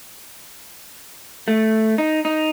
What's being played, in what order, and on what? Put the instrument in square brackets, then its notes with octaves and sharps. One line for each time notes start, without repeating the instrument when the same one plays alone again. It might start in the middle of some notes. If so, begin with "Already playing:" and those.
[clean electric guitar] A3
D#4
D#4